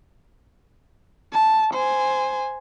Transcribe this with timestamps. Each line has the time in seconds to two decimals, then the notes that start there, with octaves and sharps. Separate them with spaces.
1.33 A5
1.74 C5 G#5